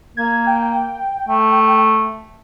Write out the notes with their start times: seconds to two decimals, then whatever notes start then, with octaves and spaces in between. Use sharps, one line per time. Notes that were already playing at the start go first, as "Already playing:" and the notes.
0.17 A#3 G#6
0.47 G5
1.29 A3